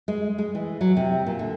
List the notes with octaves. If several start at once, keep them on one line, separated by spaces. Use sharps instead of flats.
G#3
G#3
E3
F#3
C3
A#2
D3